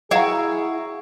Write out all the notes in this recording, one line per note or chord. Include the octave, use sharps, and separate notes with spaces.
E4 F#4 G#4 F5 A#5